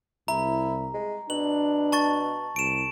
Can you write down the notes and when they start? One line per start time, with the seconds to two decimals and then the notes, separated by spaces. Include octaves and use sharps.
0.28 C2 E4 A#5
0.94 G#3
1.30 B2 D4 F#7
1.92 A5 C#6 A6
2.56 C2 D7 E7